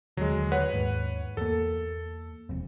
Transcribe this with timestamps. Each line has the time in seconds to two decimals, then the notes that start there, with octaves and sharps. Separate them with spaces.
0.17 D#2 D3 F#3 G#3
0.52 B4 C#5 F#5
0.73 D#2 G#2
1.37 E2 A#3 A4
2.49 E1 F2